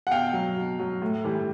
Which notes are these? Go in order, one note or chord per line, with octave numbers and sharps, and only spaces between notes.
F#5
B2 F5 G5
F#3
B2
F#3
A2
E3 G3